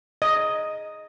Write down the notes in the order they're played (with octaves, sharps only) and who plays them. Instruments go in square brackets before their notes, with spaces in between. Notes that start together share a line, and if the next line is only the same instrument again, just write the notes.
[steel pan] D#5